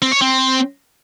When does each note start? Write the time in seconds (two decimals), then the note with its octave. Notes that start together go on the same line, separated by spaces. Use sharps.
0.02 C4
0.12 C#5
0.21 C4